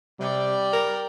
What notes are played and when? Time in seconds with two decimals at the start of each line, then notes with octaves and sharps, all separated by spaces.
0.20 C3 G3 D5 G5
0.73 A#4